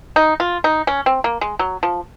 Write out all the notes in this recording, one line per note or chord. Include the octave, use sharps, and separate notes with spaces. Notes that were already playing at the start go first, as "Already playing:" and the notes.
D#4
F4
D#4
C#4
C4
A#3
G#3
F#3
F3